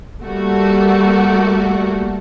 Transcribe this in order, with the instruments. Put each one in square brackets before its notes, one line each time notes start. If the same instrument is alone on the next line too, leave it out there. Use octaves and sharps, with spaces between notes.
[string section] G3 A3 A#3 F#4